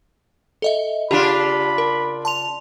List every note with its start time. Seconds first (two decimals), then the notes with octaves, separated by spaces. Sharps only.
0.62 A4 D#5 E5
1.11 C#3 D4 F4 G4 B5
1.78 A#4
2.25 A5 C6 F7